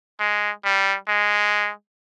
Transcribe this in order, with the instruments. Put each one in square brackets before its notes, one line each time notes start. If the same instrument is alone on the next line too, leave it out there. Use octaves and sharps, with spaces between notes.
[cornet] G#3
G3
G#3